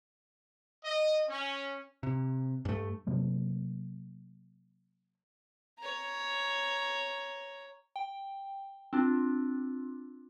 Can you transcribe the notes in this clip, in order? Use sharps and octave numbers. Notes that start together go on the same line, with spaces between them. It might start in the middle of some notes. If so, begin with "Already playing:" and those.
D#5
C#4
C3
G2 A3
C3 F#3 A3 A#3
C#5 A#5
G5
C4 D4 F4